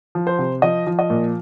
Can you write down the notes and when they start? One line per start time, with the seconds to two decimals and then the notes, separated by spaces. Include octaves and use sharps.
0.15 F3
0.27 C5
0.39 C3
0.62 F3 D#5
0.87 F3
0.99 D#5
1.10 A#2